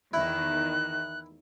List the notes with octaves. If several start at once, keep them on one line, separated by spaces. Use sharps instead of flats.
E2 D#3 E4 F#6